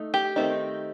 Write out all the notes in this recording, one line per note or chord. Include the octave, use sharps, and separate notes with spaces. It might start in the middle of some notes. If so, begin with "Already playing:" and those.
Already playing: A3 D#4
G4
D#3 A3 C4 D#4